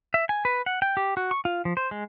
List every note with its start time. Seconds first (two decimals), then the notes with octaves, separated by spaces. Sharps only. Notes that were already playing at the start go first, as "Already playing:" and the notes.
0.14 E5
0.29 G#5
0.45 B4
0.66 F#5
0.82 G5
0.97 G4
1.17 F#4
1.31 C#6
1.45 F4
1.65 F3
1.77 C5
1.91 G#3